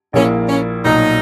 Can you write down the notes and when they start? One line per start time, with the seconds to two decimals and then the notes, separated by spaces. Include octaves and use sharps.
0.13 A#1 A#2 A#3 C#4 E4
0.49 C#4
0.84 B1 A#2 F#3 D#4